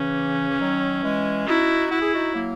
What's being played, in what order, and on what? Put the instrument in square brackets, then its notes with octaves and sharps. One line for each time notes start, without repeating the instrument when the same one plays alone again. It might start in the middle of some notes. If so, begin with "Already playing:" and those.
Already playing: [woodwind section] C#3 E3 [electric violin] C#4
[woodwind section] E3
D#3 F#3
E3 G#3
[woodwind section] D#4 F#4 [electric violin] E4
[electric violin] E4 [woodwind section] F#4
[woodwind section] G#4
D#4 F#4
F#3 A#3